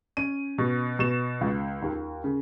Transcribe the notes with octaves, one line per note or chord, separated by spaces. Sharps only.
C#4 D#7
B2
B2 E7
C#2
D#2
C#3